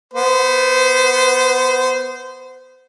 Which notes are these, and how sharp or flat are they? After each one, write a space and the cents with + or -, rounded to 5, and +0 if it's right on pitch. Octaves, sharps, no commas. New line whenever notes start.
B3 +0 C5 -25